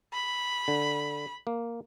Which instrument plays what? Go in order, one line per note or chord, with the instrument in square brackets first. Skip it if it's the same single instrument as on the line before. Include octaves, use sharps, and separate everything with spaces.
[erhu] B5
[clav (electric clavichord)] D3
A#3